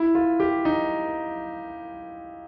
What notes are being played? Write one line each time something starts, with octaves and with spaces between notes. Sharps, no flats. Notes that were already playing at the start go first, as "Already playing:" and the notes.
Already playing: E4
F4
G4
D#4